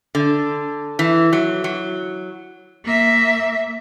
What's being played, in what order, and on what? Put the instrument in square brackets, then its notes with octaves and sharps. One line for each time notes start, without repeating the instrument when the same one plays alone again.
[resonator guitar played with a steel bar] D3
E3
F#3
F#3
[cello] A#3 E5